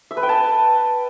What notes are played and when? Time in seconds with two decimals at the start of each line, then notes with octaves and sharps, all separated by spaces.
0.11 E5
0.17 B4
0.23 G5
0.29 A5